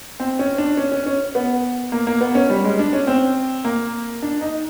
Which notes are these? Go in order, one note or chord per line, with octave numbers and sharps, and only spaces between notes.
C4
C#4
D4
C#4
C#4
C#4
B3
A#3
A#3
B3
C#4
G3
G#3
D4
C#4
C4
A#3
D4
D#4